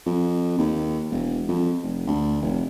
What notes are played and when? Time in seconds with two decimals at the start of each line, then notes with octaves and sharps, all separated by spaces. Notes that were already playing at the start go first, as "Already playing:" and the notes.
0.06 F2
0.58 D#2
1.11 E1
1.48 F2
1.83 F1
2.07 D2
2.42 F1